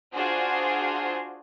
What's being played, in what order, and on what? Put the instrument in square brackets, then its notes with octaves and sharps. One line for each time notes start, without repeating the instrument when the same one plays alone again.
[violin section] D4 F4 F#4 G#4 C5